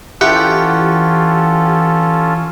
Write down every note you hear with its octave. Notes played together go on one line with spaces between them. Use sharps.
E3 C#4 F4 G4 A4 F#5